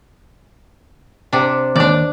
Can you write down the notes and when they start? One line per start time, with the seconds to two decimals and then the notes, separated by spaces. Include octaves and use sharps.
1.33 C3 D4
1.76 D#2 D4 D5